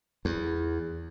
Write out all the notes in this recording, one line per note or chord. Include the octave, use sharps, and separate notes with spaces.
E2